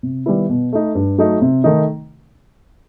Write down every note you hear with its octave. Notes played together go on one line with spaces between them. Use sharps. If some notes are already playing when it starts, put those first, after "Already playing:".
C3
D#3 G3 B3 E4
B2
A3 D#4
G2
F#3 A3 D#4
C3
D#3 A3 D#4